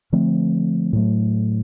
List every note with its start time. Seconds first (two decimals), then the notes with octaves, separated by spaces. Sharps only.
0.13 D3 F3 A3 C4
0.93 A2 F#3 A3